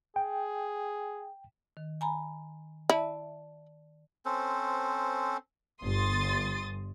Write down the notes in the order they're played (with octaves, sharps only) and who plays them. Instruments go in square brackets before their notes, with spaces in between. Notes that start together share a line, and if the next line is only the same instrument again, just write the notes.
[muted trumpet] G#4 [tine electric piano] G5
[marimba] D#3
G#5 A#5 B5
[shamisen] E4 [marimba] D5 A5
[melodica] C4 C#4 A4 C5
[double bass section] G1 [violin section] C6 D#6 A6